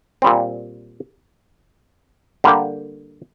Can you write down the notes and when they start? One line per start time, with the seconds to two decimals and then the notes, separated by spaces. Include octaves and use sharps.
0.22 A#2 G3 C4
2.44 D3 G3 A#3 G4